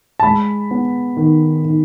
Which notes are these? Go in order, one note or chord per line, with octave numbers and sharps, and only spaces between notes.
A5
G#3 B5
B3
D#3
D#3